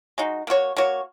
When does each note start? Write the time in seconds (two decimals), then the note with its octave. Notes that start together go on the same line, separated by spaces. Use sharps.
0.18 G#3 D#4 F#4
0.47 A#3 F#4 C#5
0.77 A#3 F#4 C#5